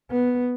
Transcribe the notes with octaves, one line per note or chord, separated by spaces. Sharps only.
B3